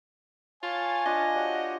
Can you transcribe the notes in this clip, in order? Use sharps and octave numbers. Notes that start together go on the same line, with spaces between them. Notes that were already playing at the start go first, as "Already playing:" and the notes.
F4 C#5 F5 G#5 A5
D4 F4 D#5
F#4 G4 C#5 D5